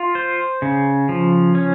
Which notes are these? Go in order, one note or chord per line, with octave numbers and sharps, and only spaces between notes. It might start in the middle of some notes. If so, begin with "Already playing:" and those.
Already playing: F4
C5
C#3
F3
C#4